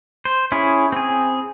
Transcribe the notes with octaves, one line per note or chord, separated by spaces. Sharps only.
C5
C#4 E4 G#4
C4 G#4